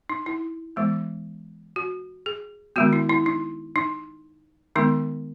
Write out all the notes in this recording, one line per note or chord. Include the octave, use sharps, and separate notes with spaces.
D#4
E4
E3 G#3 B3
F#4
G#4
D#3 G#3 B3 F#4
E4
E4
D#4
D#4
D#3 G#3 B3 D#4